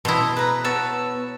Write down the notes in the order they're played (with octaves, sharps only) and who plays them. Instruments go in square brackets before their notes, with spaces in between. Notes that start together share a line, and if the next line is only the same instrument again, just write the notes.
[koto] B2 E4 [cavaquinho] A4 C6 D#6
[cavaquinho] B4 A#5
[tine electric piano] B3 A5 E6 [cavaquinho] C#5